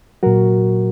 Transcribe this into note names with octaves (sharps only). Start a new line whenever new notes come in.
A#2 F#3 F#4 A#4